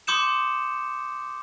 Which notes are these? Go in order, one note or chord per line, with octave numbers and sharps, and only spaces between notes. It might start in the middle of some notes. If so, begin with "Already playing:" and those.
C6 D6 D#6 G6 C#7 E7